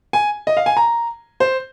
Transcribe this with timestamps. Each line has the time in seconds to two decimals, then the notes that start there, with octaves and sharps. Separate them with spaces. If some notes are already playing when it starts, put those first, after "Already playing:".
0.13 G#5
0.47 D#5
0.57 F5
0.66 G#5
0.77 A#5
1.40 C5